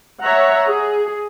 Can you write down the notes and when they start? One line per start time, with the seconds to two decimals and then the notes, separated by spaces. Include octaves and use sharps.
0.22 C#5 E5 F#5 A#5
0.66 G#4